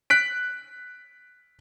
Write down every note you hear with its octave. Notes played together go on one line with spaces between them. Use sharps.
F#6 B6 D7